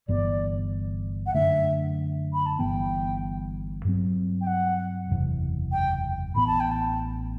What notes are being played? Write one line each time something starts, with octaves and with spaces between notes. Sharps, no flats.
G1 G2 E3 B3 D5
F#5
F#2 D3 A3 D4 E5
B5
A5
G1 G2 E3 B3 G5
G2 F#3 C4
G5
F#5
F#1 E2 C3 E3
G5
A1 A2 E3 B3 B5
A5
G5
A5